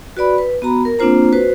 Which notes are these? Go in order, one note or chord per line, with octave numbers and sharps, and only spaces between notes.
F#4 B4 D5 B5
B4
B3 F#4 A#5 B5
A#4
A#3 C4 D4 F4 C5 A#5
F#4 B4 C5